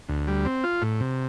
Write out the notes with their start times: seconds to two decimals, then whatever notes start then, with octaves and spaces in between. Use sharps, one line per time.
0.09 D2
0.28 G3
0.45 C4
0.64 F4
0.82 A2
1.00 C3